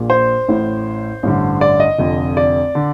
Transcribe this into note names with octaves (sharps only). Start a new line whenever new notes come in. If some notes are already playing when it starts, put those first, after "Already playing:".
Already playing: A#1 A#2
C5
A1 A2
A1 G2 D3
D5
D#5
F1 F2 D3
D5
D3